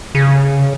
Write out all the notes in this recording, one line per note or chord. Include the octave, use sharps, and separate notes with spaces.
C#3